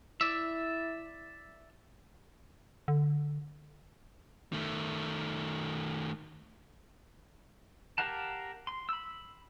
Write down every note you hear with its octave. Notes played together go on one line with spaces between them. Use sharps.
E4 D5 E5
D3
D#3 A3
G4 A#4 F5 F#5 A5
C6
B5 E6